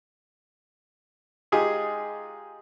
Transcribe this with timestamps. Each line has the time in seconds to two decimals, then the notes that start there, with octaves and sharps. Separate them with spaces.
1.52 G#3 D#4 F4 G4 G#4